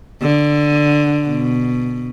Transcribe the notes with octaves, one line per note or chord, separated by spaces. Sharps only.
D3
B2